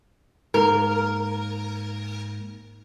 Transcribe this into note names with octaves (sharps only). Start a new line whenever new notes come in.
G#2 A#3 A#4